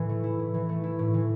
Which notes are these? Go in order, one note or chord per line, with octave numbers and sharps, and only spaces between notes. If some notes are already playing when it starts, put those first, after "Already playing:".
Already playing: A2 E3
A3
E4
A2
E3
A3
E4
A2
E3